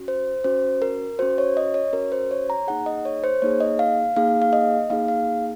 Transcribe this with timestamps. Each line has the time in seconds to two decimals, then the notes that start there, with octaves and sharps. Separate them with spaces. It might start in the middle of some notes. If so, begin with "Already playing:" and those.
Already playing: C#4 F#4
0.08 C5
0.44 C#4 F#4 C5
0.82 A#4
1.19 C#4 F#4 C5
1.38 C#5
1.57 D#5
1.74 C#5
1.93 C#4 F#4 A#4
2.12 C5
2.31 C#5
2.50 A#5
2.67 A#3 D#4 G#4 F#5
2.86 D#5
3.05 C#5
3.24 C5
3.42 A#3 D#4 G#4 C#5
3.60 D#5
3.79 F5
4.16 A#3 D#4 G#4 F5
4.42 F5
4.53 D#5
4.90 A#3 D#4 G#4 F5
5.08 F5